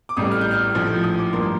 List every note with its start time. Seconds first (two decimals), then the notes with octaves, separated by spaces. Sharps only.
0.09 D6
0.17 A1 A2 G3 D#6
0.31 F6
0.41 G6
0.51 F6
0.75 A#1 A2 F3
1.04 D#6
1.18 D6
1.33 G2 F3 A#3 C6